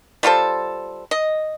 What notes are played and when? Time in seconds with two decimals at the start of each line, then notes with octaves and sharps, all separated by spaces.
0.23 G3 F4 A4 C5
1.11 D#5